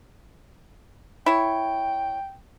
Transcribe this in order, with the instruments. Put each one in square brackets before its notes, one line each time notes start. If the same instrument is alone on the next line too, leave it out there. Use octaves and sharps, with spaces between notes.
[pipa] E4 C#5 [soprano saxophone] G5